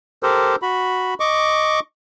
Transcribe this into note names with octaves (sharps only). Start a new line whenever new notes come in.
G4 A4 A#4 C5
F#4 B5
D#5 C#6 D6